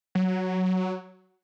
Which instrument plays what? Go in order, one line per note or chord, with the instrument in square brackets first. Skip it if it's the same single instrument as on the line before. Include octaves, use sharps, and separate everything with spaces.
[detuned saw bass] F#3